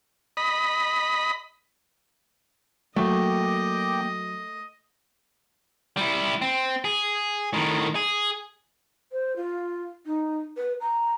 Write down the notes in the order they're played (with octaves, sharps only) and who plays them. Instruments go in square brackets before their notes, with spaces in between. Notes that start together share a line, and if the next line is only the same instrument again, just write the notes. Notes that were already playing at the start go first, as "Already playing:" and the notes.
[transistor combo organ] D#5 B5
[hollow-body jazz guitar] F#3 [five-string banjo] A3 [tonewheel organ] A#3 G5 D6 [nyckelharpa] D#5
[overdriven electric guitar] G3 E4
C4
G#4
A2 D#3
G#4
[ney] C5
F4
D#4
B4
A#5